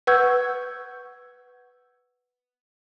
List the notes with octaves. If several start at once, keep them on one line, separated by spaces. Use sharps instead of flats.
B4 F#5 C#6 E6 G6 G#6